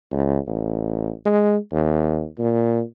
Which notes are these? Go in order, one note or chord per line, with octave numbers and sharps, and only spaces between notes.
C#2
A1
G#3
D#2
A#2